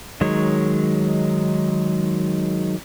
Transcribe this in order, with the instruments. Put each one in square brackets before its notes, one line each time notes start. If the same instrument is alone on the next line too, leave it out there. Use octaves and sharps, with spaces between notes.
[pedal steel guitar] D#3 F#3 G#3 C#5